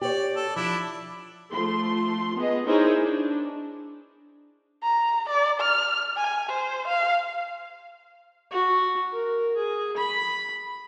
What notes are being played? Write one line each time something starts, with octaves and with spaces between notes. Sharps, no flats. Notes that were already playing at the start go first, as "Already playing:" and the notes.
G4 C#5 D5
A4
F3 D4 E4
F3 A3 C6
B3 G#4 D#5
D#4 E4 G#4 A#4 C5 C#5
D4
A#5
D5
F6
G#5
C5
F5
F#4
A#4
G#4
B5